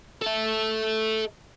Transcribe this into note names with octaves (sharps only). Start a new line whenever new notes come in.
A4 E5